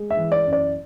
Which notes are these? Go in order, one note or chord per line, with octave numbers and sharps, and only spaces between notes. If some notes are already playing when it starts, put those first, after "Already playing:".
Already playing: G#3
E5
E3
D5
F#2
D5